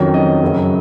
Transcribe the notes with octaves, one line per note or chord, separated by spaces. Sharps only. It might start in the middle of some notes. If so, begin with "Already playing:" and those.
Already playing: F2 D#3 F#3 C#4
D#5
F#2 C#3 F#3